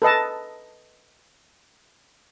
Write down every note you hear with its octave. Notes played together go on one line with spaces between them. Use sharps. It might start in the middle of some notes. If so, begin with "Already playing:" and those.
A4 B4 D#5 A5